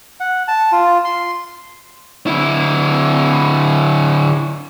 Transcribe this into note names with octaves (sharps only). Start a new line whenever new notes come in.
F#5
A5
F4
C6
D3 E4